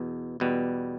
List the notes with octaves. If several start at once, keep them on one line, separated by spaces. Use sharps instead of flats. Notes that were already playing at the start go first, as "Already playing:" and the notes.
Already playing: E2 B2
E2 B2 G3